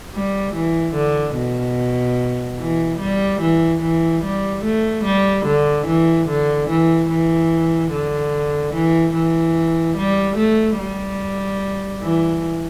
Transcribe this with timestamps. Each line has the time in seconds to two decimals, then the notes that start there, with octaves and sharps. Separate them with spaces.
0.14 G3
0.55 E3
0.95 D3
1.36 B2
2.59 E3
3.00 G3
3.41 E3
3.82 E3
4.24 G3
4.64 A3
5.05 G3
5.46 D3
5.87 E3
6.29 D3
6.69 E3
7.10 E3
7.92 D3
8.74 E3
9.14 E3
9.97 G3
10.37 A3
10.79 G3
12.02 E3